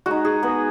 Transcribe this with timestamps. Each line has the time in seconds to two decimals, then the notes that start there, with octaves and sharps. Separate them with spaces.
0.06 G#3 D#4 F#4
0.25 G#4
0.43 B3 B4